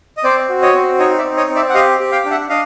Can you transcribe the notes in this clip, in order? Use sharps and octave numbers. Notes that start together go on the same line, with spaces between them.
D#5
C4 C5 D5
F#4
C#5 D#5
C4
D#4 C#5 D#5
D5 E5
C4
C#5 D#5
C4
D5 E5
F#5
G4 D#5 F5
G4
F5 G5
D4
E5 F#5
D4 D#5 F5